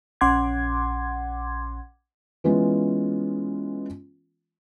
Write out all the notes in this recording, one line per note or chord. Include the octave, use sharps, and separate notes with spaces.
A#1 C#4 F#5 C6 D6 G#6
E3 G#3 B3 C#4 F4